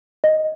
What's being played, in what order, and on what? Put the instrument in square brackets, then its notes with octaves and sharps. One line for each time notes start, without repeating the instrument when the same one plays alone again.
[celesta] D#5